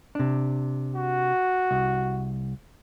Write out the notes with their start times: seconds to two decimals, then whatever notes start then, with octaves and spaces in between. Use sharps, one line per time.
0.15 C3 D4
0.96 F#4
1.71 C2